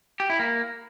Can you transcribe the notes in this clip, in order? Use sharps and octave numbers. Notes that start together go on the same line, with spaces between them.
G4
E4
A#3